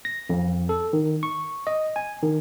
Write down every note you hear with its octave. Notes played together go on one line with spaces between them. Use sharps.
A#6
F2
A4
D#3
C#6
D#5
G#5
D#3